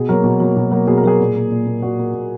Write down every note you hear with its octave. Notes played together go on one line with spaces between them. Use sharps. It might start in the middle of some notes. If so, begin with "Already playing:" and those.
Already playing: B2 G#4
F#3 A#3 A#4
B2
F#3 A#3
B2
F#3 A#3
B2 G#4
A#4
F#3 A#3 G#4
A#2
A#3
A#2
A#3
A#2 F#4
A#3
A#2